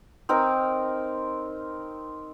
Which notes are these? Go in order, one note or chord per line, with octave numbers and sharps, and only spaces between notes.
C4 D#4 A#4 A#5